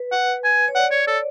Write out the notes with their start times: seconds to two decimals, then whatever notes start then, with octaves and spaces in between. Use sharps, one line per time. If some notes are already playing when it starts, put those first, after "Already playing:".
Already playing: B4
0.12 F#5
0.44 G#5
0.68 C#5
0.75 D5 F#5
0.92 C#5
1.08 A4